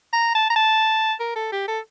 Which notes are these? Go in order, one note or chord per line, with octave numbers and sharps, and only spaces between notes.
A#5
A5
A#5
A5
A#4
A4
G4
A4